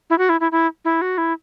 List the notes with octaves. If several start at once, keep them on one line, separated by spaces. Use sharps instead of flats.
E4
F#4
E4
E4
E4
E4
F#4
E4